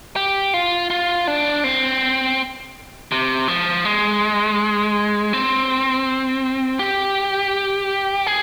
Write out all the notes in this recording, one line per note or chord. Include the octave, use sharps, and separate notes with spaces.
G4
F4
F4
D4
C4
C3
F3
G#3
C4
G4
G#4